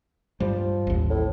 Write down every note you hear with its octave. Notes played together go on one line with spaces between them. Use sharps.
G2 F3 G3
A1 D#2
A2